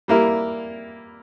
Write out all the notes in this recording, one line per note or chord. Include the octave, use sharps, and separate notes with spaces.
G3 A#3 E4 A#4